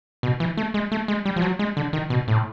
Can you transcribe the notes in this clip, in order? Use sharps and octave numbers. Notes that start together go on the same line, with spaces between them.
B2
E3
A3
G#3
A3
G#3
G3
F3
F#3
G#3
D3
D#3
B2
A2